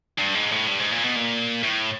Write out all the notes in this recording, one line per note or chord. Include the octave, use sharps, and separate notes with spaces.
G2
G#2
A2
G2
G#2
A#2
B2
A#2
A2